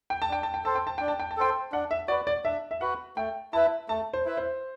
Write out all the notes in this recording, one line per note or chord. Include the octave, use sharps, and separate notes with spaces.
G5
A5
D4 G5
A5
G5
A4 C5 A5
G5
A5
D4 G5
A5
G5
A5
A4 C5 G5
D4 F#5
E5
F#4 B4 D5
D5
D4 E5
E5
F#4 B4 F#5
A3 G5
E4 B4 E5 A5
A3 A5
C5
E4 B4 E5
C5